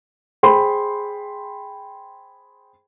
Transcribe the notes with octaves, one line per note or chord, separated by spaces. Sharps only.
G#4 C5 G5 B5 C6